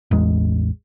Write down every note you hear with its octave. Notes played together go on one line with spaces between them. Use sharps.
A1 E2 G#3